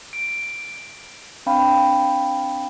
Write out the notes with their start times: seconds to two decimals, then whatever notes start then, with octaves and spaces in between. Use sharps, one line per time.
0.13 D7
1.46 C4 D4 F5 G5 B5